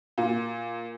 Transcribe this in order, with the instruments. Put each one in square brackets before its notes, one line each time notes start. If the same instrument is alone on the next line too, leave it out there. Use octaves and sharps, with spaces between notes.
[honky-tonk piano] A#2